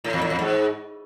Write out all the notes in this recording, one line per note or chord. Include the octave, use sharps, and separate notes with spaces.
A2
E2
A2
E2
G#2